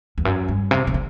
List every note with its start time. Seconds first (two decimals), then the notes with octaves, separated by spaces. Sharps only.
0.18 E2
0.25 F#2
0.48 G2
0.71 C3
0.87 C3
0.94 D3